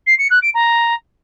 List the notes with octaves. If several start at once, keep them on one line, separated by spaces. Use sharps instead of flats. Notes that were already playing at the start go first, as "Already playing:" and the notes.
C7
C#7
F#6
D7
A#5